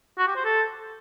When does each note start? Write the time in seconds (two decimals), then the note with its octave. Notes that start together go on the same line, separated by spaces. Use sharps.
0.18 F#4
0.27 G4
0.36 C5
0.45 A4